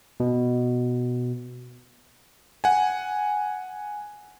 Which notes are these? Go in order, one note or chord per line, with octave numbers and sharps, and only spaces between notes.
B2
F#5 G#5